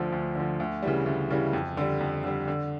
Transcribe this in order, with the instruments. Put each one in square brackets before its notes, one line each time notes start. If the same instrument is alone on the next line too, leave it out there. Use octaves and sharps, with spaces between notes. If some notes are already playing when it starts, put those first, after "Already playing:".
Already playing: [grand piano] D2 D3 F3
D2
D3 F3
D2
C#3 E3 G3
D2
C#3 E3 G3
F2
D3 G3
F2
D3 G3
D3